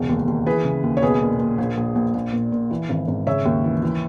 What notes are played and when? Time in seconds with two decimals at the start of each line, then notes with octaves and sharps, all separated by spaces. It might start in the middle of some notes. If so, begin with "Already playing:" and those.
Already playing: E1 C#2
0.09 D#2
0.28 D#2
0.46 E3 G#4 B4
0.65 C#3
0.84 D#2
0.97 C#5
1.02 B1 G#4 B4
1.21 A#2
1.40 A#2
1.58 A#1
1.77 A#1
1.95 A#1
2.15 A#1
2.33 A#2
2.52 A#2
2.71 E3
2.89 G#1
3.08 G#1
3.27 C#3 C#5 E5
3.45 D#2
3.64 E3
3.83 E3